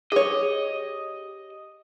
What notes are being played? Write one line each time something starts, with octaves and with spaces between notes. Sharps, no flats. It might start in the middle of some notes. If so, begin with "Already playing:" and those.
G4 G#4 C#5 D#5